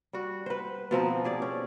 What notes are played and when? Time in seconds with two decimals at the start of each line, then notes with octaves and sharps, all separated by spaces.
0.13 G3 F#4
0.46 B4 C5
0.91 B2 F3 C4 D#4
1.24 G4 G#4 D5
1.42 C#4